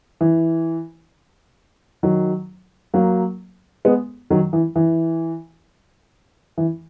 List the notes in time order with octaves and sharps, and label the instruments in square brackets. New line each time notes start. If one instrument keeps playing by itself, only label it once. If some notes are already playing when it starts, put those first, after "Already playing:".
[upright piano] E3
D#3 F#3
F#3 A#3
G#3 B3
D#3 F#3
E3
E3
E3